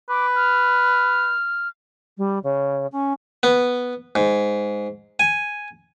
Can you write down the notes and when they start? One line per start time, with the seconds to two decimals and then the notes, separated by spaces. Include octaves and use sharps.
0.09 B4 D6
0.35 F6
2.17 G3
2.43 C#3
2.92 C#4
3.43 B3
4.15 G#2
5.20 G#5